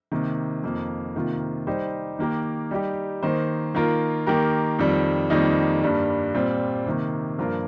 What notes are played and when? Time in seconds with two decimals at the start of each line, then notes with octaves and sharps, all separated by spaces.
0.12 C3 D#3 A#3
0.63 F2 D#3 A#3
1.15 C3 D#3 A#3 F4
1.67 G3 D#4 G4 C5
2.19 D#3 A#3 G4 A#4
2.71 G3 D#4 G4
3.23 D#3 A#3 D#4 C5
3.75 D#3 A#3 F4 A#4
4.27 D#3 A#3 G4 A#4
4.79 F2 D#3 G3
5.30 F2 D#3 G3 A#3 D#4
5.83 G2 G3 A#3
6.34 A#2 G3 C4 F4
6.86 C3 D#3 A#3
7.38 G2 F3 A#3 F4 A#4